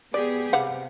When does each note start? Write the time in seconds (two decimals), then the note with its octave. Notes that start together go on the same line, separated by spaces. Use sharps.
0.14 B3 G4 G#4 D5
0.53 C3 G3 F5 F#5